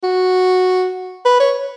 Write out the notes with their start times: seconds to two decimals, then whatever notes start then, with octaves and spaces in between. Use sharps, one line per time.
0.03 F#4
1.25 B4
1.40 C#5